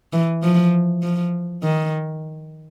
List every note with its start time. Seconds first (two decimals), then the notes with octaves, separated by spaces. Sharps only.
0.13 E3
0.43 F3
1.03 F3
1.63 D#3